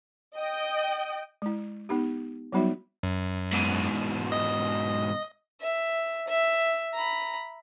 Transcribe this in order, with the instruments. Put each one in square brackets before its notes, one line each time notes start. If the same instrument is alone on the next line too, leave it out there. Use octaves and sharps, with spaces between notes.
[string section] D#5 G5
[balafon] G#3 E4
B3 D#4 G4
F#3 G3 B3 D#4 F#4 E5
[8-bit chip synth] F#2
[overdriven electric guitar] G#2 B2
[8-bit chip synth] D#5
[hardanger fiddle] E5
E5
A#5 B5